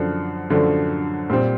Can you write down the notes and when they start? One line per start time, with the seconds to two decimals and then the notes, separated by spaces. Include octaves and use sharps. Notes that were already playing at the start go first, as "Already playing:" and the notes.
Already playing: F#2 D3 F3 A3 D4
0.50 F#2 D3 F3 A3 D4
1.30 A#2 G3 C4